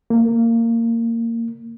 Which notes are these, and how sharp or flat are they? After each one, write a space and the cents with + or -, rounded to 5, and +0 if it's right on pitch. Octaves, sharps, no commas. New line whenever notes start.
A#3 -20